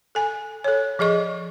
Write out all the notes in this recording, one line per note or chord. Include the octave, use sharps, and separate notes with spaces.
A4 G#5
A4 C#5
F3 G#4 D#5 C#6